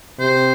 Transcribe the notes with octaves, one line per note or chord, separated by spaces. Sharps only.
C3 C5